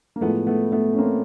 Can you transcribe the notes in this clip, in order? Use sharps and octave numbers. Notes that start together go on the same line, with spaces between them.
A#3
A2 F3 G#3 A3 B3
A3 B3
A3 B3
C#4
A#3 C4